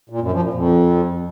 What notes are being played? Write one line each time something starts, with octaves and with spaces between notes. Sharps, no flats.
A#2
F#2
F3
A#2
F2